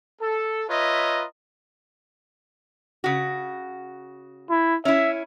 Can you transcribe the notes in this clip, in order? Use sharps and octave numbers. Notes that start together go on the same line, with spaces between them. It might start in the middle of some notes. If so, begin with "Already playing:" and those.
A4
F4 B4 C#5 D#5 E5 A#5
C#3 F#4
E4
C#4 E4 E5